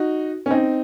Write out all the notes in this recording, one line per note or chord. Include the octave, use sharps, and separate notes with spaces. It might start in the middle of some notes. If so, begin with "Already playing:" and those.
Already playing: D#4 F#4
C#4
C4 D#4